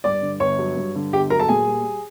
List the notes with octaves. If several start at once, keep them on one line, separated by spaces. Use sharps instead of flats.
G2 D5 D6
D3
G1 C#5 C#6
F#3
G2
D3
G1 G4 G5
F#3 A#4 A#5
A4 A5
A#2 G#4 G#5
G3